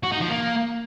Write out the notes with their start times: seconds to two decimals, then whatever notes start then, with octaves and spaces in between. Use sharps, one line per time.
0.03 F#4
0.12 D#4
0.21 F3
0.29 A#3